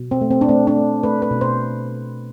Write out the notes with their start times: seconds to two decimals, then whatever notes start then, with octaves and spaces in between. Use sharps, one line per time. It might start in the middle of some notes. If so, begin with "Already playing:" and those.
Already playing: B2
0.11 C4
0.21 A3
0.31 C4
0.41 D4
0.49 A3 C4
0.67 D4
0.77 A3
1.03 A3 B4
1.22 B4
1.31 B2
1.41 C5